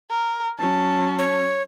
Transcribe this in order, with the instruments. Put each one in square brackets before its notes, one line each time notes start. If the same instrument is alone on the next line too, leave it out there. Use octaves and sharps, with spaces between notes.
[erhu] A#4
[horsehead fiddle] F#3 C#4 [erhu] A5
[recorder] C#5